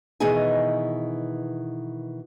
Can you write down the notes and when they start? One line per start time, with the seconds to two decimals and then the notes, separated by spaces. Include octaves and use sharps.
0.20 B2 D#3 E3 D#4 G#4 G#5